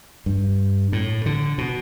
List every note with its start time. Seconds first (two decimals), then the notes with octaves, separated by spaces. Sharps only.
0.26 G2
0.92 A2
1.26 D3
1.58 B2